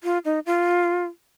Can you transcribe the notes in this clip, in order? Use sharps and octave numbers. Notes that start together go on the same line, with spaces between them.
F4
D#4
F4